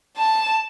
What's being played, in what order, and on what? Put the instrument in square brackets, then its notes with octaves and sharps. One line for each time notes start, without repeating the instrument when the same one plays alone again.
[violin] A5